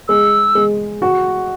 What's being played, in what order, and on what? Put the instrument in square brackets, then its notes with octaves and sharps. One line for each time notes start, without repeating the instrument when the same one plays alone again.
[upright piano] G#3 [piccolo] E6
[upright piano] G#3
F#4